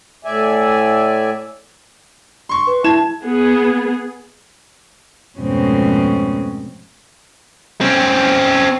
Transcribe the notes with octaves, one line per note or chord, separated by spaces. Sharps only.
A2 D5 E5 G#5
C6 C#6
B4
E4 A5 G#6 E7
B3 G#4
F2 G#2 B2 A3 C4 C#4
C4 C#4